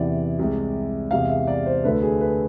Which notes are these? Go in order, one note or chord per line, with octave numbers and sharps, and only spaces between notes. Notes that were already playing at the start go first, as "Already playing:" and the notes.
Already playing: E2 C3 E3 D5
C2 C3 G#3
E2 C3 G#3 F5
E5
D5
C5
D2 D3 A3 B4
G#4
B4